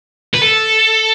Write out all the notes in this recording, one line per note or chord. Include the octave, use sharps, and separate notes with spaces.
B4
A4